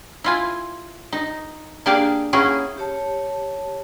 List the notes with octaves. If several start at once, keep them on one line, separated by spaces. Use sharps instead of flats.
E4 F4 G#5
D#4
A#3 D4 G4 G#4 D5 F5
A#3 C#4 E4 F#4 G#4
G4 C#5 A5